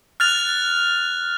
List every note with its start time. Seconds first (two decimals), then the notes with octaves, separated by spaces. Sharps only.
0.20 F6 F#6 A6 F7